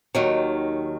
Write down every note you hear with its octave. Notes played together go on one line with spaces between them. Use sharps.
D#2 D#3 F#3